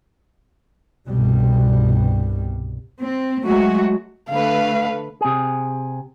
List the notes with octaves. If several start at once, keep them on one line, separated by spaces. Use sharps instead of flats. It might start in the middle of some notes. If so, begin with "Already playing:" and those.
C2 G2 B2 G3
C4
F#3 G#3 A3 F#4
D3 A3 B4 F5
C3 G#4